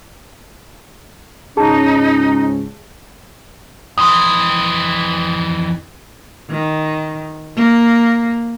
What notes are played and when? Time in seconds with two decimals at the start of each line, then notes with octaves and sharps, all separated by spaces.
1.57 C#2 G#2 C#4 D#4 G#4 A5
3.98 F2 E3 C6 D#6
6.50 D#3
7.56 A#3